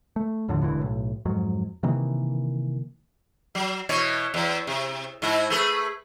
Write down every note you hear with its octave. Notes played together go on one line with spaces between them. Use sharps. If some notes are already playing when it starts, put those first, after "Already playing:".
A3
D#2 A2 D3 F3
E1 C#2 D3 E3
B1 A2
F2 G#2 F#3
C3 D#3 E3 A#3
F#3
B2 E3 C#5
E2
C3
G#2 E4
A3 G#4 B4